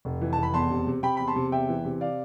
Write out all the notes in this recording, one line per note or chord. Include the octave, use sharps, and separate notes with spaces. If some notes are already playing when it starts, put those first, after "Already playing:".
F1
E3
F1 A5
B5
E2 A5 C6
C3
C3
C3 G5 B5
E2 B5
A5 C6
C3
E2 E5 G5
E3
C3
D5 F5